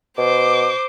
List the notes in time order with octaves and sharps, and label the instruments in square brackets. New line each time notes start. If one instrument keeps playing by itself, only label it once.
[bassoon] B2 [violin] C5 [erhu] D6